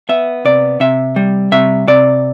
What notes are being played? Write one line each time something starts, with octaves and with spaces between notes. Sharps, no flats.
B3 E5
C3 D5
C3 E5
G3
C3 E5
C3 D5